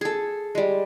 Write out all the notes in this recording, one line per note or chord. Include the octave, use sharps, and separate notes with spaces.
G#4 A4
G3 G#3